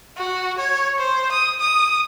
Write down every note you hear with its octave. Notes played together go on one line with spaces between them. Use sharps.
F#4
C#5
C5
D#6
D#6